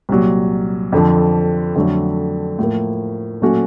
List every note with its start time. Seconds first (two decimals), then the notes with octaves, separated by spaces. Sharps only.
0.09 C2 A#2 F#3
0.92 F2 D3 F3
1.75 F2 D3 F#3 A3 D4
2.59 A2 F3 A#3
3.42 A#2 F#3 A3 C#4 F#4